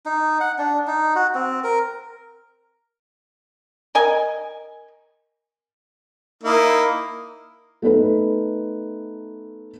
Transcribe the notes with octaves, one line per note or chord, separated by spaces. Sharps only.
D#4
F#5
D4
D#4
F#4
C4
A#4
A#4 D#5 G#5
A#3 D#4 E4
A3 B3 D#4 A4 B4